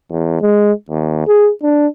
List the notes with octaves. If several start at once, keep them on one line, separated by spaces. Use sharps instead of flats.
E2
G#3
D#2
G#4
D4